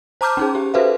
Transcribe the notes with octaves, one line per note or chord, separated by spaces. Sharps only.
C5 A5 A#5 D6 F6 G6
C#4 D#4 G#4
G4
F#4 A4 B4 C5 E5 F5